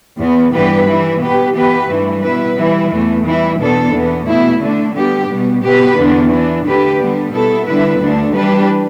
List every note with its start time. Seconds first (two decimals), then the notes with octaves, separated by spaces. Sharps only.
0.18 E2 E3 B3
0.53 G2 E3 B3 G4 B4
0.87 E3 G3 E4
1.21 B2 B3 G4 B4
1.55 E3 B3 G4 B4
1.88 G2 E3 A3 E4
2.23 B2 G3 E4 B4
2.57 E3 G3 E4
2.91 E2 E3 A3
3.25 E3 G3 E4
3.58 E2 B2 B3 D4 A4
3.93 E2 E3 B3
4.26 B2 A3 E4
4.61 D3 A3 D4
4.95 D3 G3 B3 G4
5.29 B2 G3 B3
5.63 B2 B3 G4 B4
5.97 E2 D3 B3 D4
6.31 E3 B3 D4
6.65 D3 A3 G4 B4
6.99 D3 G3 B3
7.33 B2 B3 E4 A4
7.67 D3 G3 E4 B4
8.00 D2 D3 A3 D4
8.35 E3 G3 D4 G4 B4